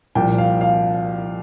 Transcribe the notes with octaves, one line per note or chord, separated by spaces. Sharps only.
C2 A#2 F3 G5
F5
F5